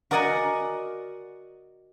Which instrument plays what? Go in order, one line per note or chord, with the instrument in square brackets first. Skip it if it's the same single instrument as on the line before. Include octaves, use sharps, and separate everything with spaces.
[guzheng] F#4 A#4 D5 D#5 F#5 G#5